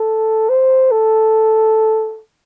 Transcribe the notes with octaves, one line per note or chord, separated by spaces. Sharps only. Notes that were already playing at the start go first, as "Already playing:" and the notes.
Already playing: A4
C5
A4